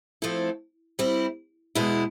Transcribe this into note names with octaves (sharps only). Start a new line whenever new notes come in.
F3 A3 C4 E4 A4
G3 C4 E4
E2 B2 G#3 B3 E4